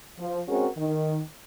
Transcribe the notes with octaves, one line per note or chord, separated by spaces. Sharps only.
F3
G#3 C4 C#4 F#4 G#4 A#4
D#3